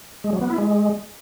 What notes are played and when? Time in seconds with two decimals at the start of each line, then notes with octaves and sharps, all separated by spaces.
0.24 G#3
0.33 F#3
0.41 B3
0.50 E4
0.58 G#3